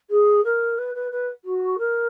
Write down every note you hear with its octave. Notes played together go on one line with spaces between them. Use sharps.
G#4
A#4
B4
B4
B4
F#4
A#4